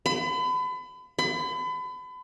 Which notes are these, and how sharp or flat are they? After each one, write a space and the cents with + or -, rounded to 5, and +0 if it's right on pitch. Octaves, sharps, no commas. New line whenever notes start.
B5 +35
B5 +35